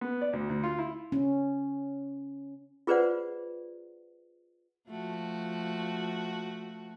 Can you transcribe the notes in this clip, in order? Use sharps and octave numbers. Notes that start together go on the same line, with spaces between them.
B3
D5
D2
D2
F4
E4
C#4
F4 G#4 B4 C5 D5 F#5
F3 A3 F#4